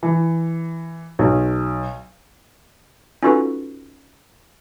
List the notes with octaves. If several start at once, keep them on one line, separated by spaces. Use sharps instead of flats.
E3
B1
C#4 D#4 F4 F#4 A4 B4